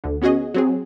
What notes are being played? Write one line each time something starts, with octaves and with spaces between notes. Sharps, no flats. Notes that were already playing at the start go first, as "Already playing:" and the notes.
D2 D3
B3 C#4 F#4 G#4 D#5
F#3 C4 G#4